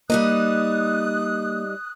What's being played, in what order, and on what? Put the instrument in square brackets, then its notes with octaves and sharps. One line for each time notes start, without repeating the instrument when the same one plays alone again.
[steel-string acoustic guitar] G3 D#4 D#5 [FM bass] A#3 [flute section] D#6 F#6